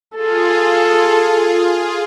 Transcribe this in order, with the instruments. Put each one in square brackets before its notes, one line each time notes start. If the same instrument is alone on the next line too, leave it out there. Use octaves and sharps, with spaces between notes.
[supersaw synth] F4 G#4 [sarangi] A4